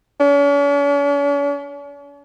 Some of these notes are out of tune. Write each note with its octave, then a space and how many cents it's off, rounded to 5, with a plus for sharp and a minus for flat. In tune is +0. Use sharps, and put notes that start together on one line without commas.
C#4 +45